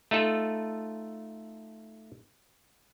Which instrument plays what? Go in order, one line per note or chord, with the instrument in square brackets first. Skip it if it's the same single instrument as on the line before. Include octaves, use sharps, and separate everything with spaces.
[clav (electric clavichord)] A3 D#4 F4 A4